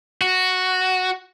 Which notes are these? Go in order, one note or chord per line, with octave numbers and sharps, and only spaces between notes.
F#4